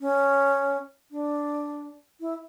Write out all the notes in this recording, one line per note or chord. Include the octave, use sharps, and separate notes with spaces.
C#4
D4
E4